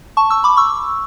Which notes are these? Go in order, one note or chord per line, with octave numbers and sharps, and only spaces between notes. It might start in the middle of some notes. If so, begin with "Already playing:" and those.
A5 C#6
C#6 E6
B5 D6
C#6 E6